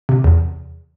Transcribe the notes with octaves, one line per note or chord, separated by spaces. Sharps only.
C3
E2